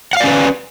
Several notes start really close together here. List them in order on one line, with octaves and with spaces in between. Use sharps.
F#5 F5 D5 C#4 B4